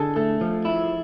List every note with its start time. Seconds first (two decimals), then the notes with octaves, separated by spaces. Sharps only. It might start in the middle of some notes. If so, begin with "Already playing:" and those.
Already playing: D3 G#4 A4
0.16 A3 A4
0.41 F3
0.65 E4